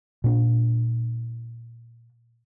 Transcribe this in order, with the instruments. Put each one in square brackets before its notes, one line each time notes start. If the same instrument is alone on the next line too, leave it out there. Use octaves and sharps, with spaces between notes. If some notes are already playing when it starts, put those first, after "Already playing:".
[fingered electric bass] A#2 D4